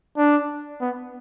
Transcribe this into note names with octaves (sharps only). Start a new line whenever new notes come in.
D4
B3